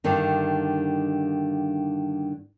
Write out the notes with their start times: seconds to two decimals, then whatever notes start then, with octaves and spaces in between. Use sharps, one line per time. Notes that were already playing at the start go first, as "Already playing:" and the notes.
0.04 G2 D3 D#3 D#4